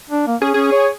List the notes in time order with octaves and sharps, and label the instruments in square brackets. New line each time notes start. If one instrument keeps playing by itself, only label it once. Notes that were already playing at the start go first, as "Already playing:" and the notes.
[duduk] D4
A#3
[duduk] C#4 [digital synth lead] G#4
[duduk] C#4 [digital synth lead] G#4
[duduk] C#5